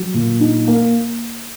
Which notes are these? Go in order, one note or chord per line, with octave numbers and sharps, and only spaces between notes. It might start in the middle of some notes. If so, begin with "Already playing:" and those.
Already playing: F#3
A#2
D#4
A#3